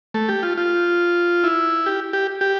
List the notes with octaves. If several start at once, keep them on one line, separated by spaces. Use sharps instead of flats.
A3
G4
F4
F4
E4
G4
G4
G4